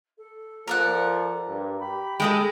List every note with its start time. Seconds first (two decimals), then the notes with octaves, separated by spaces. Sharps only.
0.18 A4
0.67 F3 A#4 D5 F#5
1.48 G2
1.80 G4 B5
2.20 G#3 A4 D#5 G5